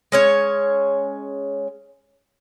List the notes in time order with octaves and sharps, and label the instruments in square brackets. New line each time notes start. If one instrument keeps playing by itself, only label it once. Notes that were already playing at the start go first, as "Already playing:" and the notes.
[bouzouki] G#3 C#4 C#5